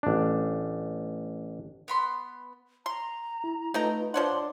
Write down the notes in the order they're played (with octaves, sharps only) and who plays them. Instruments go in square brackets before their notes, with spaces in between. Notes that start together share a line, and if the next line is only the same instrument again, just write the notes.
[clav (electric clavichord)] A1 D4
[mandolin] B3 B5 C6
[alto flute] A#5 [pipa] C6
[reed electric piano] E4
[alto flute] A3 [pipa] D#4 G5 A#5 [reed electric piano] F4 B4 D#5
[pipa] F3 C#5 F#5 [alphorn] D4 [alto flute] C6